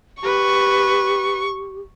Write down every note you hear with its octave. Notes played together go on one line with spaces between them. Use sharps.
G4 B4 C#6